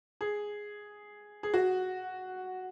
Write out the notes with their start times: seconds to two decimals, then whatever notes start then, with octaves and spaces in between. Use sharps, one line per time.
0.21 G#4
1.43 G#4
1.54 F#4